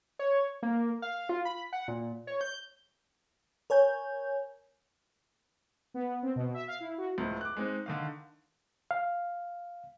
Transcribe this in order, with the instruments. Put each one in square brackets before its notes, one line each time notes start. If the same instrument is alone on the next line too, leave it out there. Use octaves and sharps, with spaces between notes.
[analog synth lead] C#5
A#3
F5
F4
B5
F#5
A#2
C#5
G6
[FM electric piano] A#4 C#5 G#5 G6
[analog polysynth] B3
C4
B2
E5
F5
E4
F#4
[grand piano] C#2 A2 F3
D6 F#6
G#3 C4 D#4
D3 D#3 F5
[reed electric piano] F5